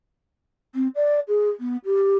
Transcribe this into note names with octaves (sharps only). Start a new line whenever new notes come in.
C4
D5
G#4
B3
G4